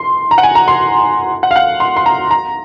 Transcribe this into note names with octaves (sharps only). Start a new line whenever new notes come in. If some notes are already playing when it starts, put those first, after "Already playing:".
Already playing: C6
A#5
F#5
G#5
A#5
C6
F#5
F5
F#5
C6
C6
A#5
A#5